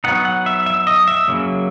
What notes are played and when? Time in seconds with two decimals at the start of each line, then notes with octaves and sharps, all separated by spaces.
0.04 F#3 B3 D#4 F#5
0.25 F#5
0.46 E5
0.66 E5
0.87 D#5
1.08 E5
1.28 C#3 F#3 A#3